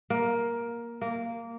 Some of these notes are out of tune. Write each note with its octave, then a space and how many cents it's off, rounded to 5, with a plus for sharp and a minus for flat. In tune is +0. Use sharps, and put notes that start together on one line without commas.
A#3 +10
A#3 -10